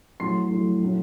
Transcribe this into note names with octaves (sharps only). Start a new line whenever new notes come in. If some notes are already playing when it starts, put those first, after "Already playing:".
A2 F#3 C6 C7
A2 F#3
A2 F#3